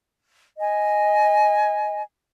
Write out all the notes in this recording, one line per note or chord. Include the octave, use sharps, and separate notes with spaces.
D#5 G#5